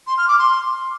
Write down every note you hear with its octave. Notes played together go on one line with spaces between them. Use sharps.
C6
F6
D6
C6